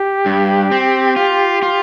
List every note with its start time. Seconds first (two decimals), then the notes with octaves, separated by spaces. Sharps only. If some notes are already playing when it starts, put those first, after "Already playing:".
Already playing: G4
0.26 G2
0.71 C4
1.16 F4
1.62 F4